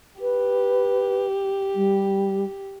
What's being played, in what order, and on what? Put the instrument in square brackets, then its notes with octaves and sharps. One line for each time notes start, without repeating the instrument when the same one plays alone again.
[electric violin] G4 [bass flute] B4
[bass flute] G3